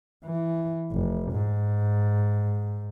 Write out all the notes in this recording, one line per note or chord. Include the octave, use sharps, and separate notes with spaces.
E3
F1
G#2